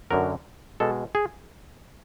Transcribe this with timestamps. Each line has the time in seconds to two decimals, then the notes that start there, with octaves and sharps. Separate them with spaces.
0.11 F#2 D3 F#3 A#4
0.80 B2 G#3 A4
1.15 G#4